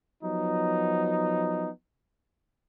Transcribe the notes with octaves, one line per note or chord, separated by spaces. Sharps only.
F3 F#3 B3 D#4